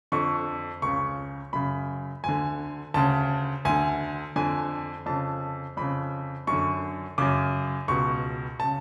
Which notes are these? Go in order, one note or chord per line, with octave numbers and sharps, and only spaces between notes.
F2 D3 C#6
C#2 C#3 C#6
F#2 C#3 B5
D2 D3 G#5
D2 C#3 A5
D2 D3 G#5
F2 D3 G#5
F2 C#3 A5
F2 C#3 B5
F#2 C#6
D3
F#2 C#3 D6
C#2 B2 C#6
C#3 A5